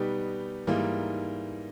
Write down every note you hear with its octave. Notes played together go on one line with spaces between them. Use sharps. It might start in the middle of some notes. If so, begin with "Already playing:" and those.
Already playing: B2 G3 B3 D#4 G4
G#2 E3 G3 A#3 D#4